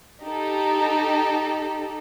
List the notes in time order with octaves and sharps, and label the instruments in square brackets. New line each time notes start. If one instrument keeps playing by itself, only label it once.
[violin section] D#4 G4 A4